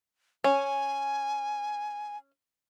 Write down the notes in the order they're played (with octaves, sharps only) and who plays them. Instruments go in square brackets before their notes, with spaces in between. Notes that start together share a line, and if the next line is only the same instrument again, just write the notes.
[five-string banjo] C#4 [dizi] G#5